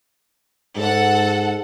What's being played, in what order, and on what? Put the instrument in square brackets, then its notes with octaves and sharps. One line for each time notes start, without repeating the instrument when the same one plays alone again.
[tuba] G#2 [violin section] A4 F#5